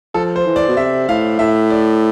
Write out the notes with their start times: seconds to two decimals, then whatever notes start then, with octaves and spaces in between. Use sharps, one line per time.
0.14 F3 A4
0.36 C5
0.46 E3
0.56 D5
0.68 B2
0.77 C3 E5
1.08 A2 F5
1.39 A2 E5
1.70 D5